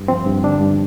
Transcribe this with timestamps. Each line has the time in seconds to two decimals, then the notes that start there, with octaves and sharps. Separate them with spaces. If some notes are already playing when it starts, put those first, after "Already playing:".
Already playing: G2
0.08 F3 C4
0.26 G2
0.43 D3 D4
0.61 G2